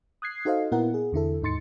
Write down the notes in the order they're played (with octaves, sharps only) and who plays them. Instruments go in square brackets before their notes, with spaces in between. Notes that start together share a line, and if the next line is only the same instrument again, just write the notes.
[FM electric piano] D#6 F#6 G#6 C7
D#4 F#4 A4 C5 D#5 F5
A#2 B3 E4 A#4 F#5
G#4
E2 D3 E4 A4
D#2 G#2 D#4 C6 A6 C#7